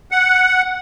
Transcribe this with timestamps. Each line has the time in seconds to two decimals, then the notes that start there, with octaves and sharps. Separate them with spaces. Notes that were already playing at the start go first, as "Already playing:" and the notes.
0.12 F#5